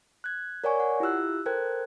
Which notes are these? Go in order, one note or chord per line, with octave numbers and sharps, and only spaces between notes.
F#6 G#6
A#4 C#5 D5 F#5 G#5 C#6
F#5
E4 F4 G4 E6 F#6
A4 A#4 C5 G5 F#6 G#6